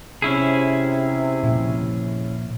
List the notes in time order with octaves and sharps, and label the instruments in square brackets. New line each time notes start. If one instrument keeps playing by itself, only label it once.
[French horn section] C3 [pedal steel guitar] C#4 E4 G#4
[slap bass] A#2 C#3 F3